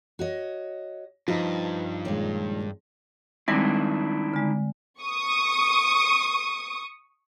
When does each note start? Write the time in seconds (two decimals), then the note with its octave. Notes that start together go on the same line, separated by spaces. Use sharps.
0.19 F#4 C#5 D#5
1.28 G2 F3 D#4 B4
2.05 D#2 A#2 G#3
3.48 D#3 G3 G#3 C4 D4 E4
4.34 D3 G#3
5.00 C#6 D#6